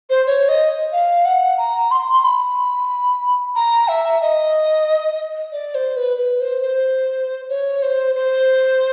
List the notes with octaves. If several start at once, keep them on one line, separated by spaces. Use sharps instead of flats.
C5
C#5
D#5
F5
F#5
A#5
C6
C6
B5
A#5
E5
D#5
D5
C5
B4
B4
C5
C5
C#5
C5
C5